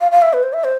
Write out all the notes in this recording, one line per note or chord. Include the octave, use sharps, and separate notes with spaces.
F5
F5
E5
B4
C5
E5
C5